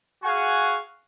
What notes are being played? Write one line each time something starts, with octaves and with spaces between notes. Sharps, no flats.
F#4 G#4 F5 F#5 G#5 C#6